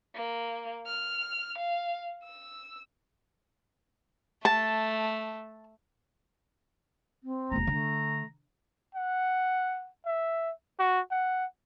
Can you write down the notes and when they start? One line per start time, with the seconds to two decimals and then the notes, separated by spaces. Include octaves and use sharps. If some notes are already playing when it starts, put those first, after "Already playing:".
0.15 A#3
0.86 F6
1.58 F5
2.24 E6
4.45 A3 A5
7.24 C4
7.52 E1 A#3 A#5
7.67 D3 A3
8.95 F#5
10.06 E5
10.79 F#4
11.11 F#5